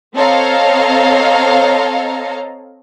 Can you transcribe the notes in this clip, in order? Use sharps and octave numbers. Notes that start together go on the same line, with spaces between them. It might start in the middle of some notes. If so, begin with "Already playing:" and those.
C4 A4 C#5 D#5 F5 A#5